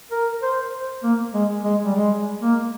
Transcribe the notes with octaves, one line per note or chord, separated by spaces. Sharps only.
A#4
C5
A#3
G#3
G#3
G3
G#3
A#3